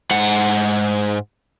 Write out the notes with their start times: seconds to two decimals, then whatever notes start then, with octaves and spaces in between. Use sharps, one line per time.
0.11 G#2 F#5